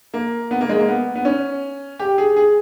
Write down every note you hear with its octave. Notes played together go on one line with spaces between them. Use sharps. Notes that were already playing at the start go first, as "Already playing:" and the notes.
A#3
B3
A#3
G#3
A#3
B3
B3
C#4
G4
G#4
G#4